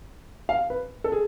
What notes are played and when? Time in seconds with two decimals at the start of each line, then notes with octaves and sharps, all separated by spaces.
0.49 F5
0.70 B4
1.04 A4
1.12 G#4